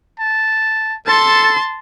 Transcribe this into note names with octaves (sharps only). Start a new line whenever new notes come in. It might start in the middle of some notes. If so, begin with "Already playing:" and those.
A5
A4 A5 C6